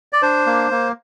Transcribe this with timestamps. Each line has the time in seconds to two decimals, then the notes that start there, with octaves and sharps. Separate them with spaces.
0.13 D5
0.22 D4 C5
0.47 A#3
0.71 A#3